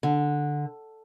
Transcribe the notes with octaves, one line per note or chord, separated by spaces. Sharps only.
D3